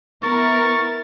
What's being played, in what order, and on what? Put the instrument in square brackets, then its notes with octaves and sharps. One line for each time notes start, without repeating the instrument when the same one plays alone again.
[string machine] B3 [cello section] E4 A#4 [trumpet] C#6 [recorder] A6